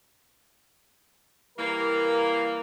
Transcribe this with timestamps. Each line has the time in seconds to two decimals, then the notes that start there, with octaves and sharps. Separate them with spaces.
1.58 E3 G3 A#3 A#4